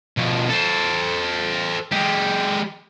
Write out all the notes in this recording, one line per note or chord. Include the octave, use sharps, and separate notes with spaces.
B2 F3
A4 C5
G#3 G4